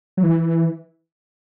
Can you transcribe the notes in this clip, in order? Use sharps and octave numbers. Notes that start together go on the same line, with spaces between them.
F#3
E3